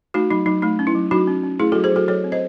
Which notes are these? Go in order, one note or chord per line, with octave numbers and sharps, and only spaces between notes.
A3 D#4 F#4
F#3 D#4
F#3 D#4
A3 D#4
C#4
E4
F#3
F#3 D#4 F#4
C#4
C#4
A3 E4 G#4
F#3 F#4 A4
G#4 C5
F#3 F#4 A4
F#3 A4 C#5
C4
C5 D#5